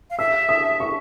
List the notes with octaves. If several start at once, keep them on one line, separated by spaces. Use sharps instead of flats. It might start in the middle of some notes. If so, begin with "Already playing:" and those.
F5
E5 E6
D#6
C#6